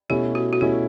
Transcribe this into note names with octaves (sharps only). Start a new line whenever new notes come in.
B2 A3 C#4 E4 G4
F#4
F#4
B2 A3 C#4 E4 G4